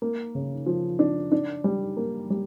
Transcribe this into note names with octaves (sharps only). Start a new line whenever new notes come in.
A#3
C#3
F3
D4
D4
G3
A#3
G3